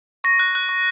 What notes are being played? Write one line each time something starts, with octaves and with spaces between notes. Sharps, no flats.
C#6 A#6
F#6
F#6
C#6